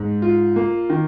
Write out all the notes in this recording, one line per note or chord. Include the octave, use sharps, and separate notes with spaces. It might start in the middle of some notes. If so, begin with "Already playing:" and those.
Already playing: G#2
F4
A#3
D#3